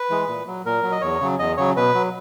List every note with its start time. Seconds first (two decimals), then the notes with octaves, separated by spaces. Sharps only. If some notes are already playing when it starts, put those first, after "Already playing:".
Already playing: B4
0.10 E3 G#3
0.28 A#2
0.47 F#3
0.65 A#2 A#4
0.83 F#3
0.92 D#5
1.01 E2 C#5
1.21 C#3 F#3
1.39 E2 D#5
1.57 C#3 F#3 C#5
1.76 B2 B4
1.95 F#3